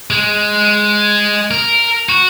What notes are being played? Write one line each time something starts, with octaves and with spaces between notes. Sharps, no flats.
G#3
A#4
F#4